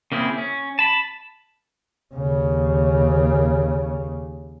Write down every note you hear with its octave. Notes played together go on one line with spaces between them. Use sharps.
C#3 A#3 C4 E4 G#4
C#4
A5 B5
D#2 C#3